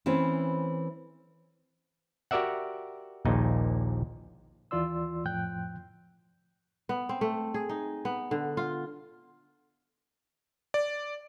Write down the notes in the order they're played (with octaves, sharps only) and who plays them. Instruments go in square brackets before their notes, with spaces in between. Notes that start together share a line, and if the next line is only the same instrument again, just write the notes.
[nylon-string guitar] E3 A3 C4 C#4 E4
[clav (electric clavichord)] F#4 G4 A#4 D5 E5 F#5
A#1 D#2 A#2 D#4
[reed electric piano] D#2 E3 F4 D5 C6 E6
F2 A2 F3 G5 F#6 G6
[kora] B3
C4
A3
G#4
D#4
B3
D3
F4
[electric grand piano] D5